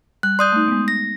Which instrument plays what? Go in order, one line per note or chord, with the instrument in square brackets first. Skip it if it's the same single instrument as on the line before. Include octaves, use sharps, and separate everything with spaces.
[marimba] G3 [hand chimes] F#6
[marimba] D5 [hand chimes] C6 D#6 G6
[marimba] A3 D#4
G#3 B3
[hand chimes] A#6